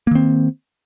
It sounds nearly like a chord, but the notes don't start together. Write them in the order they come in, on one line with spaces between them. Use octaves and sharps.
A#3 D#3 C4